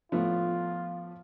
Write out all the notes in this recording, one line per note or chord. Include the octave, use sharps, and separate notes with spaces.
A2 F3 A3 B3 F4